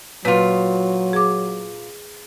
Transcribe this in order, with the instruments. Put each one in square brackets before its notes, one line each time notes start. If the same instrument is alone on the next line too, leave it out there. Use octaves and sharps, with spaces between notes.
[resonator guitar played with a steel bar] A#2 F4 [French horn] F#3 [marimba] B4
[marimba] G#4 D6